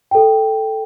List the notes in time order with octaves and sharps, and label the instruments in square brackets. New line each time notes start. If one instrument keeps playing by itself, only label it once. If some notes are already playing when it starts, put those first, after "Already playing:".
[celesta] A4 G5